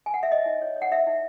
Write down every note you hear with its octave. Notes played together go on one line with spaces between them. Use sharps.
G#5
F#5
E5
C#5 D#5
D#4
C#5
C#5
F#5
D#4 E5
D#4